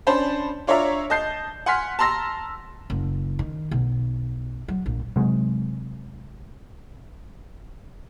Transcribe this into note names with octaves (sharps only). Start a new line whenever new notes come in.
C#4 D4 C5 A5 B5
D4 F4 C#5 D5 E5 A#5
D#5 A5 G6 C7
F#5 G#5 C6 F6 B6
A5 A#5 C6 E6 A#6
F#1
D#3
B1
F#3
A#1
C3 F#3 G#3